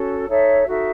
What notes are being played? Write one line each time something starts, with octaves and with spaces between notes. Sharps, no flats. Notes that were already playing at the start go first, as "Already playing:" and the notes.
Already playing: C#4 F#4 A4
D#4 A4 C#5 E5
D#4 F#4 A4 E5